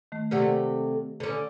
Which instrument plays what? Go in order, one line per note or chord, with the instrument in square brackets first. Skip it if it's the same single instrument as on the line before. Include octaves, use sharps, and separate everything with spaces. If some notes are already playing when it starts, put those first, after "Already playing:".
[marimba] D#3 A3
[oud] C3 A3 A#3 [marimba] G4 D5 F#5
[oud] D3 C#4